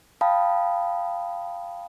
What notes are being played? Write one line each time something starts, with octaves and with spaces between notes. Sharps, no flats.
F5 G5 A5 B5 D#6